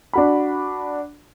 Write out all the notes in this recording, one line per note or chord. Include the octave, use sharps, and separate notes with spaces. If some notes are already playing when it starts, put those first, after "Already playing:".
D4 F#4 B5